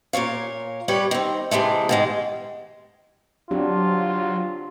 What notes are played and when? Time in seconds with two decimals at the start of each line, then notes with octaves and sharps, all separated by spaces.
0.13 A#2 A#4 C#5 F5
0.88 G3 G4 B4 C#5
1.11 D#3 C4
1.51 C3 E3 G#3 A3
1.89 G#2 D#3 G#3
3.51 F#3 C4 D4 F4 G4